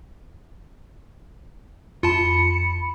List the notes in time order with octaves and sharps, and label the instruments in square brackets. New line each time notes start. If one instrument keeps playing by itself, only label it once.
[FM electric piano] F2 [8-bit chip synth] F4 A5 [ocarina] B5 [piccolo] C#7